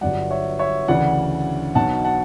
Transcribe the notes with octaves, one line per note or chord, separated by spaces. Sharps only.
G1 G2 F#3 D5 F#5
C#5 E5
C#5 E5
D2 C#3 E3 D5 F#5
B1 B2 F#3 F#5 A5
F#5 A5